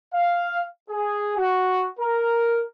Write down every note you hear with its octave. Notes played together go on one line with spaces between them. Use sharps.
F5
G#4
F#4
A#4